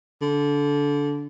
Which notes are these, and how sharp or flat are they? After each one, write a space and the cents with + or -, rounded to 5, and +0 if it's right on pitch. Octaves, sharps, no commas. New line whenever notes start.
D3 -20